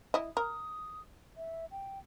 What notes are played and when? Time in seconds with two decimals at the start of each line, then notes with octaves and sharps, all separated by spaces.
0.14 E4 D#5
0.37 A#4 D#6
1.37 E5
1.71 G5